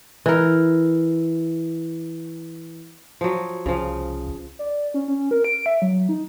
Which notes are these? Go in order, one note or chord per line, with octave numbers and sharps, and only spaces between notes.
E3 A#4
F3 F#3
C2 C#3 F3
D5
C#4
C#4
A#4
D7
E5
F#3
D#4